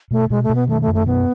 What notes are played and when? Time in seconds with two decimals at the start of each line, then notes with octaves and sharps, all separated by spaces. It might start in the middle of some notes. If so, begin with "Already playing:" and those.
0.11 B2 A3
0.30 B2 G#3
0.43 A3
0.49 B2
0.55 B3
0.68 D#3 A3
0.82 A3
0.87 F#2
0.94 A3
1.06 B2 B3